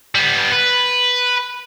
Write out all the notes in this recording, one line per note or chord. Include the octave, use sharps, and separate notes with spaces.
G3 B3
B4